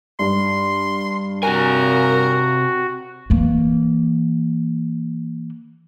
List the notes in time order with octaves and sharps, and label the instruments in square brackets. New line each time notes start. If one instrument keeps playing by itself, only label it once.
[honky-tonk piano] G2 [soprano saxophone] C6
[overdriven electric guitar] C3 G#5 [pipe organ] F#4 [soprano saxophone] A#4
[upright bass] E3 A#3